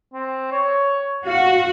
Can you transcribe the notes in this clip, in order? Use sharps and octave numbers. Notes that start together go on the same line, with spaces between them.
C4
C#5
F#4 F5